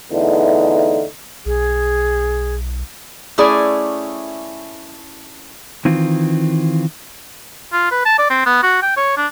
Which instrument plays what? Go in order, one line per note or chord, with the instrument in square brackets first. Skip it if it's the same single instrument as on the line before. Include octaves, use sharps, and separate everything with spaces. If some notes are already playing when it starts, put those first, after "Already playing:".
[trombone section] E2 D3 A3 D#4
[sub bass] B1 [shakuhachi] G#4
[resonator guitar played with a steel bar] A3 C#4 E4 G#4 D5
[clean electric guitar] D#3 E3 C4 F4
[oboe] F4
B4
A5
D5
C4
B3
F#4
G5
C#5
D4